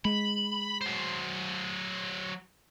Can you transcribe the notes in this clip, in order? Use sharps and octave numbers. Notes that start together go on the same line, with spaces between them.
G#3 B5
F#3 C5